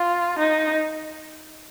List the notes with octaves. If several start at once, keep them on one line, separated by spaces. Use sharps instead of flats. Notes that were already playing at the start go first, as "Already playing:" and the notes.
Already playing: F4
D#4